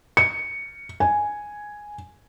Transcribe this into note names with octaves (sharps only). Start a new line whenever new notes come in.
C#7
G#5